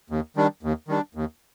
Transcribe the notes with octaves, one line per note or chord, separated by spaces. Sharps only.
D#2
D#3 G3 D4
D#2
D#3 G3 D4
D#2